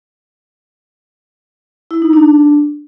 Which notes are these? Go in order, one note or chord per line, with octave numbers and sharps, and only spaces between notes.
E4
D#4
D4